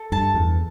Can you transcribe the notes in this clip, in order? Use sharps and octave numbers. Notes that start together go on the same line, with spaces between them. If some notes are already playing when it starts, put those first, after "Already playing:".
Already playing: A4
G2 A5
E2